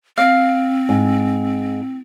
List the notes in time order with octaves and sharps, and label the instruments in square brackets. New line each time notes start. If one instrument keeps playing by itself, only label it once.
[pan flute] C4 [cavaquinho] F5
[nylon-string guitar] G#2